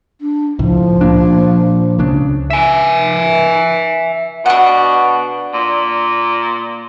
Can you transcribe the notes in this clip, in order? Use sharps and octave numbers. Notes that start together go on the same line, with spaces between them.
D4
C#2 A2 F3
A#2 A#3 D4
C#2 C#3 D4
E5 G#5
B2 D4 F#5
A#2